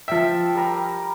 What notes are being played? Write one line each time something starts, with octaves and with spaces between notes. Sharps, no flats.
F3 E5 G5 A5
G3 A#4 A#5